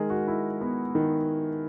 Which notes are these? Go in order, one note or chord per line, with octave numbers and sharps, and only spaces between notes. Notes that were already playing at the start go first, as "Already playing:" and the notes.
Already playing: D#3 G#3 G#4 A#4
F#4
E4
B3
D#3